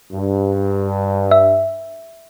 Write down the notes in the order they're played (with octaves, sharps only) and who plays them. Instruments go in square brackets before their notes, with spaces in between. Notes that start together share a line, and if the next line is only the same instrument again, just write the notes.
[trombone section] G2
[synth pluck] E5